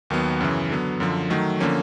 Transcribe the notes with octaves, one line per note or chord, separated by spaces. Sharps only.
D#2 D#3 F#3 B3
F#2 C#3 E3
D3 F#3 B3
F#2 D3 F3
D#3 F#3 A3
D3 F3 A#3 C#4